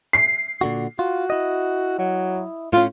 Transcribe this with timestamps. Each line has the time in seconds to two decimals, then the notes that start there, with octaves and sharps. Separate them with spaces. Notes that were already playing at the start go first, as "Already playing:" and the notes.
0.13 C7
0.61 A#2 D3 F#4
0.99 F4 F#4
1.30 E4 D#5
1.99 F#3
2.73 A2 C#4 F4